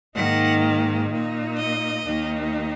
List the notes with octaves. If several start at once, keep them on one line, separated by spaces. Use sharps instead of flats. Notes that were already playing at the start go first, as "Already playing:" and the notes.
G#2 D#3 A#3 D#4 F#5
A#2 A#3 D#4
D#5
D#2 D#3 A#3 D#4